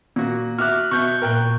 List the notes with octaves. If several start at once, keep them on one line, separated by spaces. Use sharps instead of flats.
A#2 F#4
F#4 E5 D6 F6 F#6
B2 E5 C#6 G6
A#2 A#4 G5 F#6